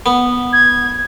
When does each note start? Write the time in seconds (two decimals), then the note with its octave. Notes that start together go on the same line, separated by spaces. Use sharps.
0.06 B3
0.53 G#6